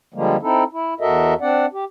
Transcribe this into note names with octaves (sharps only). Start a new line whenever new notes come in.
D3 F3 G3 G#3 A#3
C4 D#4 E4 A4
E4
E2 F#4 A4 A#4 D#5 E5
C4 D4 D5 F#5
G4